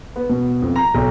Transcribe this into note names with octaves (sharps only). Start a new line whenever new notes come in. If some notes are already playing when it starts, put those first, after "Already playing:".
B3
B2
F2
A#5
B1